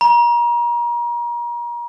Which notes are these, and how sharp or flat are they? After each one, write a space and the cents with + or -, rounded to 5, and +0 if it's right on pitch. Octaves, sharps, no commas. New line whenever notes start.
A#5 +35